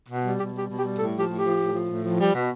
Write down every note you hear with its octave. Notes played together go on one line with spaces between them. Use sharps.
B2
G3
B2 G4
G3 G4
B2
G4
G3
A2 A4
F3 G4
A2
G4
F3
A2
F3
A2
F3
G3
B2